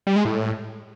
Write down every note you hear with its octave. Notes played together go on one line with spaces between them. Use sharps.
G3
G#3
A2